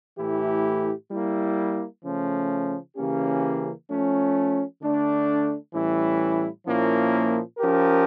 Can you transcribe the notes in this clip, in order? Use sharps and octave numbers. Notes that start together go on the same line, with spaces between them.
A2 E3 A3 E4 G4
G3 A#3 E4
C#3 F3 A3 C#4
C#3 E3 A#3 C#4 G4
F3 A3 C#4
D3 A3 D4
A2 E3 G3 C#4 E4
A#2 F3 A#3 C#4 E4
F3 C#4 G4 A#4